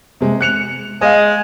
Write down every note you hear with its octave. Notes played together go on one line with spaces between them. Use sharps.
C3 G#3
F#6 C#7 F7
G#3 D#5 F5